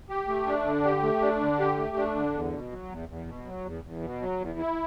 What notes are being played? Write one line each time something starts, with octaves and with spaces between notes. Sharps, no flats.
G4
A3
D4
D3
G4
A3
D4
D3
G4
A3
D4
D3
E2
B2
F#3
E2
E2
B2
F#3
E2
E2
B2
F#3
E2
E4